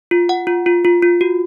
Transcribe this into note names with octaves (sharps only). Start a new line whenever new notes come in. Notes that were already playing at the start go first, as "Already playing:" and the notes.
F4
F#5
F4
F4
F4
F4
F#4